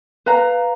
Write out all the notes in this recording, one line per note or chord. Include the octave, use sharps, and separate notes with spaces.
B4 F5 A#5